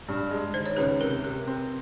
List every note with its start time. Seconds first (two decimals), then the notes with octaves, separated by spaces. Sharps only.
0.08 G2
0.30 G#3
0.54 D#3 C5
0.66 C#5
0.77 C#2 B4
1.00 C3 A#4
1.24 C3 A#4
1.47 C4 B4